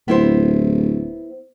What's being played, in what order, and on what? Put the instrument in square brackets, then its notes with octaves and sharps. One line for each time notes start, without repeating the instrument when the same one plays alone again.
[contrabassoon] D1 [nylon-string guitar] B3 E4 C5